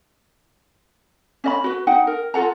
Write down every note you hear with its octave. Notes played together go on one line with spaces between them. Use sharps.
C#4 D#5 B5
F#4 B4
D#4 F#5 G5
A#4
F4 A4 F#5 A#5